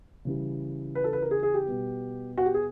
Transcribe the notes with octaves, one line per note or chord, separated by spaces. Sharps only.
C#3 E3 G3
B4
A4
B4
A#4
G#4
G#4
G4
B2 G3 B3
F#4
G4
G#4